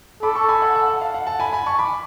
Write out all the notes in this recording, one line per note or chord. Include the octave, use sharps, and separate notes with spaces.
A4 B5 D6
A5 C#6
G#5 B5
F#5
F#5 A5
F#5
F5
F#5
F#5 A5
G#5 B5
G#5 B5
A5 C#6
B5 D6